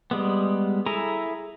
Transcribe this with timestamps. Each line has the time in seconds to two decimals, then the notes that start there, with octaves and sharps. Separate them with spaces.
0.11 G3 G#3 B3
0.86 E4 G#4 A4 G#5 A#5